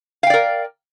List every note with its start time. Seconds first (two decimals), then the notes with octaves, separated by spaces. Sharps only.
0.23 F5
0.27 G5
0.30 D5
0.34 A#4